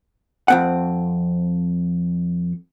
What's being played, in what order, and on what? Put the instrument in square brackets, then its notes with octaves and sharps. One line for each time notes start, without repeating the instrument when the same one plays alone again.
[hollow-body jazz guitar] F2 C4 F#5